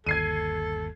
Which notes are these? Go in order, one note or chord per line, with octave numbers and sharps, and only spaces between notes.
G1 D#2 A4 G#6 C7 D#7